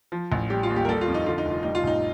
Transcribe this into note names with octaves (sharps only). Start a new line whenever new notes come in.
F3
A1
G3 G4
F4
D#2
G4
A#4
G3 A4
F4
F2
D#4
D3 F4
D#4
F1 F4
G3 D#4
F4
A1 D#4